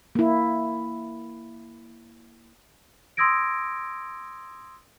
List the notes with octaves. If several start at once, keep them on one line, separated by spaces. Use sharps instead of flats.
A#3 E4
C6 D#6 E6 G#6 A#6 D7